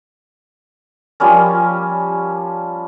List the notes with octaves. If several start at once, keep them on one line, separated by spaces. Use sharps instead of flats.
F3 G3 A#3 C#4